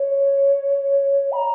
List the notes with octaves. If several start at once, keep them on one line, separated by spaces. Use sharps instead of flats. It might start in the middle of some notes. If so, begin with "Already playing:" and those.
Already playing: C#5
B5
A#5